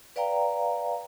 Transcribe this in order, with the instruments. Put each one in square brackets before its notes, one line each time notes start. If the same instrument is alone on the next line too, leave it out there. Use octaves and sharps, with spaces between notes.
[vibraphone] B4 D5 F5 G5 A#5